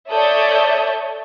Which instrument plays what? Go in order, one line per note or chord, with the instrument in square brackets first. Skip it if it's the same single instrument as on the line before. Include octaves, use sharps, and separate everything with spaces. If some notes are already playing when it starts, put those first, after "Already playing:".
[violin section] A4 C#5 D5 E5 D#6 G6